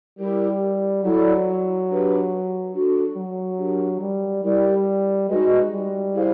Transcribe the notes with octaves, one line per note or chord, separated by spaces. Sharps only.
G3 E4 G4 A#4
F#3 E4 A4 D5
D4 G4 B4
D4 F#4 A4
F#3
D4 G4 A#4
G3
G3 E4 G4 A#4 D5
G#3 D#4 F#4 B4 D#5
G3
E4 G#4 C5 F5